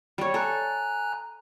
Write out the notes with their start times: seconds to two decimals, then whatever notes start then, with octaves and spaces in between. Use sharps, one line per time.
0.18 G3 C#5
0.34 A4 G#5 A#5 F#6